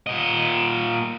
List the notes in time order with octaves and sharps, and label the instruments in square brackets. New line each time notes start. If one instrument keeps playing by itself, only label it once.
[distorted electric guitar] A#2 D#5